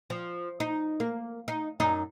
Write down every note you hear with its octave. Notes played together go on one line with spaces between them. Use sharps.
F3
D#4
A#3
D#4
F#2 D#4